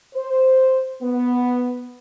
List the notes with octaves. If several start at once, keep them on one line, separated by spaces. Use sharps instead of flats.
C5
B3